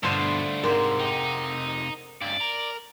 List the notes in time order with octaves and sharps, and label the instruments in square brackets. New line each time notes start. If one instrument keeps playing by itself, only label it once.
[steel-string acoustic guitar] G2 [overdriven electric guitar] B2 [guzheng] D3 C5 [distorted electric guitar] A3 F4
[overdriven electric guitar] F2 C3 [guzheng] G#2 C5 [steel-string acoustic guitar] A#4 F#5
[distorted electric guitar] D#4 [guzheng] G5
[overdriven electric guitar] C#2 G2 [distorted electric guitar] D5
[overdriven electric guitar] A#4